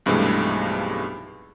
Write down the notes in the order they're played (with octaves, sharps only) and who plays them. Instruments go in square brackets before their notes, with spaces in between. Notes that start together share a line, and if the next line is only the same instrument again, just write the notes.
[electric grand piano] B1 G2 C3 E3 G#3 A3